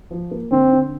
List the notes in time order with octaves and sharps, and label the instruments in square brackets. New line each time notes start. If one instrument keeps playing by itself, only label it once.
[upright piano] F3
A#3
[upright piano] D3 [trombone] C4
[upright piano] D3